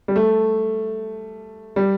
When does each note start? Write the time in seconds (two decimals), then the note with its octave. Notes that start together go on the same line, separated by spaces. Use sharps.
0.08 G3
0.16 A3
1.76 G3